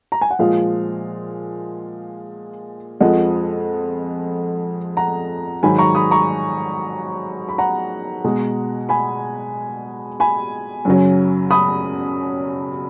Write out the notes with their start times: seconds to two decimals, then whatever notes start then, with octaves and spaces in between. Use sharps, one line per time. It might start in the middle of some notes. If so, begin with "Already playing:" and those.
0.12 A#5
0.21 G#5
0.31 F#5
0.39 A#2 F3 G#3 F5
3.00 F2 F3 G#3 D#5 F#5
4.97 F#5 A#5
5.63 G#2 D#3 F#3 G#5 B5
5.79 A#5 C#6
5.95 B5 D#6
6.11 A#5 C#6
7.49 B5
7.58 F#5 A#5
8.24 B2 G#3
8.89 G#5 B5
10.20 G#5 B5
10.85 F#2 C#3 F#3
11.51 B5 D#6